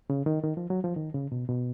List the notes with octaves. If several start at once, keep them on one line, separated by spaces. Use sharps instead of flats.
C#3
D#3
D#3
F3
F#3
F3
D#3
C#3
B2
B2